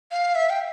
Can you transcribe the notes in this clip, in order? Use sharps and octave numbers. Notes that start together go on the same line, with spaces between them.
F5
E5
G5